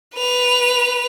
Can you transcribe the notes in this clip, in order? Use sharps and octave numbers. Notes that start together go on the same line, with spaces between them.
B4 F7